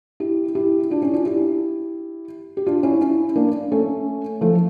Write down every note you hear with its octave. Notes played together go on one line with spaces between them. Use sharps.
E4 G4
E4 G4
D4 F4
C#4 E4
D4 F4
E4 G4
G4
D4 F4
C#4 E4
C#4 E4
A#3 D4
A3 C#4
F3 A3